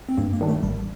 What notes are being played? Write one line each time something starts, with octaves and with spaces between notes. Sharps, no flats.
C4
G2 A#3
A#3
D#3 G3 D4
A3
A1 G3